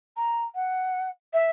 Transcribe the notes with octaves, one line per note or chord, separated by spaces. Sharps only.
A#5
F#5
E5